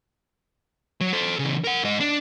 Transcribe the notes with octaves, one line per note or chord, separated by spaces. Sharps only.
F#3
A4 C5
C#3 E3
A#4 F#5
G#2 D#5
D4